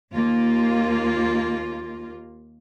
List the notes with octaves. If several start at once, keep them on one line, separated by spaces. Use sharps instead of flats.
D#2 A#3 F4